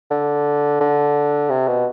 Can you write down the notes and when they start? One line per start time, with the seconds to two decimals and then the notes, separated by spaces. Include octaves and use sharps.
0.11 D3
0.80 D3
1.50 C3
1.68 B2